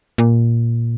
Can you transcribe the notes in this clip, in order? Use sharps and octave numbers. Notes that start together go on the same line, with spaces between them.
A#2